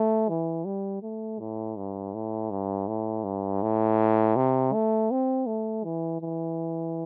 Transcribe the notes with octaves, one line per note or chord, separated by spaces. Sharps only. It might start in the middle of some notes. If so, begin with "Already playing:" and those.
Already playing: A3
E3
G3
A3
A2
G2
A2
G2
A2
G2
A2
C3
A3
C4
A3
E3
E3